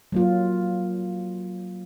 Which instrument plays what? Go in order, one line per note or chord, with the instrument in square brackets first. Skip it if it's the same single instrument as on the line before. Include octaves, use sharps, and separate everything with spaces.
[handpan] F#3 A#3 F4